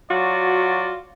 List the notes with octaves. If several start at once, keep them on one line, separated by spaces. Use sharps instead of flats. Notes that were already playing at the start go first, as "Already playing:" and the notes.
F#3 F4 F#4 D5